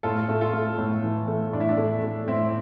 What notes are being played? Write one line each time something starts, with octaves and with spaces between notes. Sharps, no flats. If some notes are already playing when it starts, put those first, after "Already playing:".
A2 F4 A4
A3
F4 A4
A3
A2
E3
A3
A2 D4
E4
D4
A3
A3
A2 C4 E4